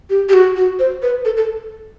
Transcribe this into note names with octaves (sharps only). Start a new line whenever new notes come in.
G4
G4
F#4
F#4
C5
B4
A4
A4